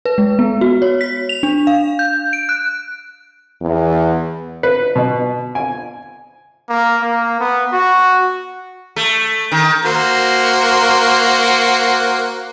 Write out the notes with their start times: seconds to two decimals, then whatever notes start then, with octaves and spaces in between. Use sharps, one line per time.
0.05 B4
0.18 G#3
0.39 B3
0.61 F#4
0.82 C#5
1.01 B6
1.29 F7
1.43 D4
1.67 F5
1.99 G6
2.33 D7
2.49 F#6
3.62 E2
4.63 B4
4.95 B2
5.55 G#5
6.69 A#3
7.02 A#3
7.40 B3
7.72 F#4
8.96 A3
9.52 D#3
9.85 A#3 F#4 C5